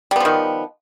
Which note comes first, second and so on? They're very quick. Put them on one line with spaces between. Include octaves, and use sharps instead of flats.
G3 B3 F3 D#3